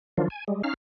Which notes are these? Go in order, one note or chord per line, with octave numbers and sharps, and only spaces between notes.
D#3 F3 F#3 D4 F4
G#5
G3 G#3
C#4 D#4 F5 F6